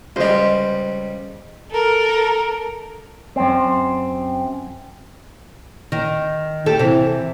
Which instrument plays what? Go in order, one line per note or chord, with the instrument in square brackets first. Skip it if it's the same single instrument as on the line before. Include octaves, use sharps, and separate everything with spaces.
[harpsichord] C#2 G3 [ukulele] C5 D#5
[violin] A4 A#4
[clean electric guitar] F#2 C4
[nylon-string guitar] D#3
G4 A4
C3 E3